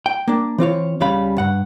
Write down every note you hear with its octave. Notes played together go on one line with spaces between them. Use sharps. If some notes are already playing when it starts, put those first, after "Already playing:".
G5
A#3 D4
E3 C4 F4 C#5
C#2 C#3 G3 F5 B5
G2 F#5